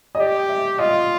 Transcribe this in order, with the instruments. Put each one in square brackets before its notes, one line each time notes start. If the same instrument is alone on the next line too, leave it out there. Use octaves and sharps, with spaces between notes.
[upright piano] D#5
[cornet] G4 [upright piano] D5
[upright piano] E5
[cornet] F4 [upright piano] D#5